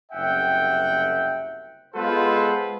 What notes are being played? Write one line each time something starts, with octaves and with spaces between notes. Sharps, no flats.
F#1 C2 E5 F#5 G5
G#3 B3 F4 A4 B4 C5